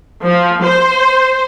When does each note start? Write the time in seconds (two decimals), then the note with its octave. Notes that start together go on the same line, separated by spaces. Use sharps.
0.23 F3
0.63 C5